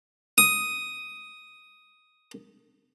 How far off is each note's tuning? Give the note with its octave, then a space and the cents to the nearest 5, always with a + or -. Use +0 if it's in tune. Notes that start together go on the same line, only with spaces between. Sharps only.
D#6 +5